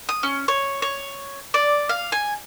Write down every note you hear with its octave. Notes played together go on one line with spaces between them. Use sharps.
D#6
C#4
C#5
C#5
D5
F5
G#5